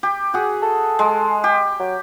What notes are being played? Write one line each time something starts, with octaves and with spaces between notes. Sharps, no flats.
G4
F#4 G#4
A4
G#3
G4
F#3